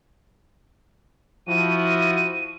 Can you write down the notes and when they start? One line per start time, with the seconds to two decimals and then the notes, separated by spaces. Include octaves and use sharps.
1.47 F3 E4 F#4 D#7